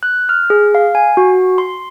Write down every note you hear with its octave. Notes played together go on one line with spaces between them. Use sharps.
F#6
F6
G#4
F5
G#5
F#4
C6